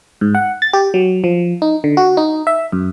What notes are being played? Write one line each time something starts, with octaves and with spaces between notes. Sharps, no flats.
G#2
F#5
A6
G4
F#3
F3
D#4
D3
F#4
D#4
E5
F#2